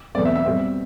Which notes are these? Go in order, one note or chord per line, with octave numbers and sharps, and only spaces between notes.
E2 B2 A3 C4 D5
E5
E5
B2 G3 C4